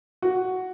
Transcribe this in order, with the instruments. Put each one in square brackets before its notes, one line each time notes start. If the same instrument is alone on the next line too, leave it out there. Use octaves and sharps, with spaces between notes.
[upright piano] F#4